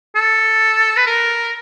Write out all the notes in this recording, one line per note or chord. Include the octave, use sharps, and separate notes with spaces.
A4
B4
A#4